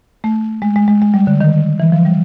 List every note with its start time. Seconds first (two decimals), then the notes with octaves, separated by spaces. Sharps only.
0.24 A3
0.62 G#3
0.76 G#3
0.88 G#3
1.02 G#3
1.14 G3
1.27 D3
1.41 D#3
1.80 E3
1.92 F3
2.05 G3